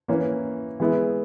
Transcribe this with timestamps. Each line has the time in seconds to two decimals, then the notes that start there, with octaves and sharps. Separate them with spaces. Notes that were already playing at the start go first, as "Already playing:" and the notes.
0.08 E3 A#3 C#4
0.80 E3 G#3 B3 E4